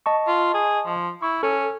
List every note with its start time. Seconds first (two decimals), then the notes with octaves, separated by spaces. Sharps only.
0.06 D#5 A5 C#6
0.27 F4
0.54 G#4
0.86 F3
1.22 E4 C#6
1.43 C#4 A4